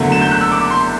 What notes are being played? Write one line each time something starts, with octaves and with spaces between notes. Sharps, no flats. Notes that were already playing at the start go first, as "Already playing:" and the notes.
Already playing: F#1 E2 D3 F#3 A3
E7
G6
F#6
E6
D6
C6